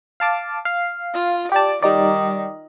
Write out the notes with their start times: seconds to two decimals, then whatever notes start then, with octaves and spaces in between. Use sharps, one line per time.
0.20 F5 A5 D6
0.65 F5
1.14 F4
1.52 G4 D5 A5
1.82 D#3 G3 D#4 D5